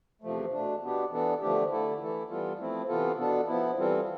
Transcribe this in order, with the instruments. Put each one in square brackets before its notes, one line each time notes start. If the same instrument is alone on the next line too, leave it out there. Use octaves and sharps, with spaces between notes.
[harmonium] E2 C3 F3 A3
B2 A3 D4
B2 B3 D4 G4
E3 B3 D4 A4
D3 F3 A3 D4 G4
D3 A3 E4 A4
E3 A3 E4 A4
E3 G3 B3 F4 A4
F3 A3 C4 E4
C3 E3 B3 F4 A4
B2 B3 D4 A4
F3 B3 E4
E3 G3 C4 F4 A4